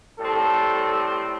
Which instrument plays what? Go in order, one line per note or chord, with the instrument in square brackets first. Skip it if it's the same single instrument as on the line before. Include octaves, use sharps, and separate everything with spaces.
[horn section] A2 G3 C4 A4